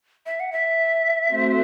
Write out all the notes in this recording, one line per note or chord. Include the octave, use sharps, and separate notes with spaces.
E5
F#5
E5
A3 C4 F#4 C5